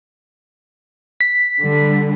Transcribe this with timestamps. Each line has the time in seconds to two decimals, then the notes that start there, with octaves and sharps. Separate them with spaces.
1.21 B6
1.61 D3 G3